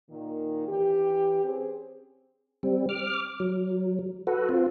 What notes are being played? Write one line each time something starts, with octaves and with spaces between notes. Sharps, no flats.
A#2 D#3
E3 C#4 G4
C4 C#4 G#4 B4 C5
G3 C4
D6 F6
F#3
F#4 A4 B4
C4 F4